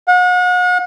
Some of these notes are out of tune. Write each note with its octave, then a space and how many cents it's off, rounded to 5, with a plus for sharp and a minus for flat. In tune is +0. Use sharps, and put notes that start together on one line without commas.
F#5 -40